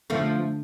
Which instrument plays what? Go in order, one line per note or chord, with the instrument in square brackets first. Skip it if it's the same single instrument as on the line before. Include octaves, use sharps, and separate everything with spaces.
[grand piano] D3 [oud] F3 A3